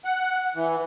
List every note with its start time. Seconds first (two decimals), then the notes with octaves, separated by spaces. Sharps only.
0.05 F#5
0.55 E3